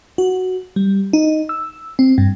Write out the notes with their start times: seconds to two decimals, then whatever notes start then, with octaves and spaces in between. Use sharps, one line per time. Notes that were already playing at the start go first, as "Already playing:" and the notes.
0.18 F#4
0.76 G3
1.13 D#4
1.49 E6
1.99 C4
2.18 G2